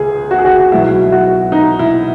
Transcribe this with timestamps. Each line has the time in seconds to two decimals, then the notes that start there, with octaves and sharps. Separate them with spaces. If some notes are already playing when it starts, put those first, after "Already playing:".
Already playing: C#2 G#4
0.31 F#4
0.38 G#4
0.45 F#4
0.71 B1 B2 E4
1.12 F#4
1.52 D#4
1.79 E4